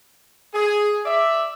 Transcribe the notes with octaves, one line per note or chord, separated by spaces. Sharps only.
G#4
D5 E5